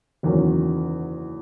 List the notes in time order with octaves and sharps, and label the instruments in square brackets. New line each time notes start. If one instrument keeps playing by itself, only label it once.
[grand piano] F#1 E2 D#3 F#3 C#4